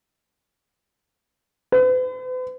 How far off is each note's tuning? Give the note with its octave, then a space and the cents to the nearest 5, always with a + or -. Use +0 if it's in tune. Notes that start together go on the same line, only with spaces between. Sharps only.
B4 +45